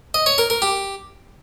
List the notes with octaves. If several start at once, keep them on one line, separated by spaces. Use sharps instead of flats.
D#5
C#5
A#4
A#4
G4